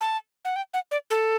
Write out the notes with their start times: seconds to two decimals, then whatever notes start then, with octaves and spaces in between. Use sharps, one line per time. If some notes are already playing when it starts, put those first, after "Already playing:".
0.01 A5
0.45 F#5
0.56 G5
0.74 F#5
0.91 D5
1.10 A4